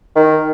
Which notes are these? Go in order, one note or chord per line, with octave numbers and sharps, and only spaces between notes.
D#3